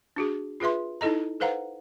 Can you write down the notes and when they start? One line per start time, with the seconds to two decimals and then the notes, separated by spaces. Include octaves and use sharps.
0.16 D4 F#4 G#4
0.60 F4 G#4 B4 E5 C6
1.01 D#4 E4 A4 D#5 A#5
1.40 A4 B4 C5 F5 F#5 A#5